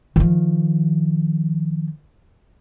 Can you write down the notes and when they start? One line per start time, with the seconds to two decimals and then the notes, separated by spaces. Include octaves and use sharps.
0.16 D#3 F3